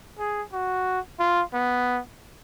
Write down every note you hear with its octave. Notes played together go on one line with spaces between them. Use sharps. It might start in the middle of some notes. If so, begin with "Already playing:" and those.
G#4
F#4
F4
B3